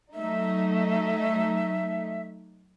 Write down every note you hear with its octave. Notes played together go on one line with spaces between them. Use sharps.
F#3 A3 D#4 E5